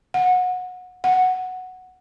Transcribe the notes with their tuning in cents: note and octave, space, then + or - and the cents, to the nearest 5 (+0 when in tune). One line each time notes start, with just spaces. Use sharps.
F#5 -25
F#5 +0